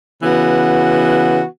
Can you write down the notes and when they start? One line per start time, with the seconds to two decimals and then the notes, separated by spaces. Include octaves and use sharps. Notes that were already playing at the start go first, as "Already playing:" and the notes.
0.21 C#3 E3 B3 F#4